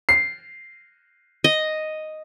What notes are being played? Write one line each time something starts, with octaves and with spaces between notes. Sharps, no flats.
C7
D#5